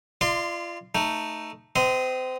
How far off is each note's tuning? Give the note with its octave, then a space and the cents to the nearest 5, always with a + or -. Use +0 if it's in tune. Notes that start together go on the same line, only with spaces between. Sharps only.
F4 -30 D5 +35 C6 -5
A3 +10 D#4 +0
C4 -30 D#5 +0 C6 -25